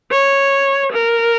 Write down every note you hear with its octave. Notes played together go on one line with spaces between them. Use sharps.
C#5
A#4